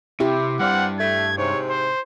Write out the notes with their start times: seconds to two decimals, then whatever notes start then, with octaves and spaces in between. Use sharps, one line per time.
0.20 C3 E4 G4
0.59 G2 C4 D5 F5 F#5
0.99 A3 G#6
1.38 G#2 C3 C#5
1.70 C5